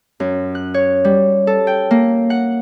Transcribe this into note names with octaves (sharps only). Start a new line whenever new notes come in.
F#2
F#6
C#5
G3
A4
G5
A#3
F#5